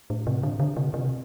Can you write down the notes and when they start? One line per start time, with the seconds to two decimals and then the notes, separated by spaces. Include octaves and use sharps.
0.10 A2
0.27 C3
0.43 D3
0.60 D3
0.77 C3
0.94 C3